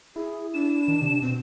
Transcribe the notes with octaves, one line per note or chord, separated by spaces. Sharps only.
E4 G#4
D4 E7
D#3
C3
B2 C4